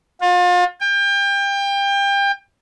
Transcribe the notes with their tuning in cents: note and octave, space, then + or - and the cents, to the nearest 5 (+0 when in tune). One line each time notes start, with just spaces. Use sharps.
F4 +35
G5 +30